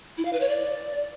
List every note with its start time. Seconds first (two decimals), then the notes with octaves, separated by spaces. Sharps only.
0.18 E4
0.25 F5
0.33 B4
0.40 C#5
0.48 D5